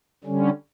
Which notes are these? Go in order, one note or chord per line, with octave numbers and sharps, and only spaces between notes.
D3 G3 C#4